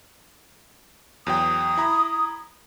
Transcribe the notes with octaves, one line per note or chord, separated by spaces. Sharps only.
E2 F#3 G5 D#6
E4 A#5 B5